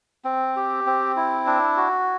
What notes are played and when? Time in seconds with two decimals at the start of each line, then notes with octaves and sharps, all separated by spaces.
0.24 C4
0.56 G4
0.86 C4
1.16 E4
1.47 D4
1.77 F#4